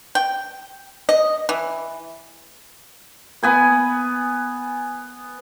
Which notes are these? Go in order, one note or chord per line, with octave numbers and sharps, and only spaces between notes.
G5
D#5
E3
B3 G#5 B5